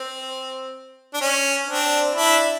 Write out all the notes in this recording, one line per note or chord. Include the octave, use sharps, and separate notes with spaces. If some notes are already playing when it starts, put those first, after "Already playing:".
Already playing: C4
D4
C#4
C4 D4
D4 E4